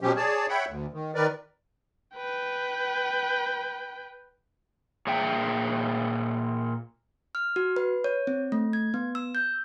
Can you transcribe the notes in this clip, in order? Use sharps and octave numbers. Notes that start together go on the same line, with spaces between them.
B2 F3 F#3 C#4 G4
G#4 C#5 D5 A5
C#5 E5 F#5 G5 B5
D2
D#3
D#3 A#4 B4 D5
B4 G5
A#2 G#4 E5 G5
F6
F#4
B4
C#5
C4
A3
G#6
B3
E6
G6